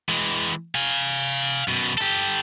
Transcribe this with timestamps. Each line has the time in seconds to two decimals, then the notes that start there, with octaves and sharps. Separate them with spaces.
0.09 E3 G#3
0.75 F5 G#5
1.68 F#2 B2
1.98 G4 A4